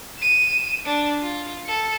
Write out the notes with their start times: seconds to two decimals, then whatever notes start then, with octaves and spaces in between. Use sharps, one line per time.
0.19 D#7 E7
0.85 D4
1.21 F4
1.66 A4 C#7